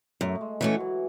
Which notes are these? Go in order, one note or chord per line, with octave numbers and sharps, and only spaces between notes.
F#2 A3
G#3
E3 F#3 A3 C#4
E3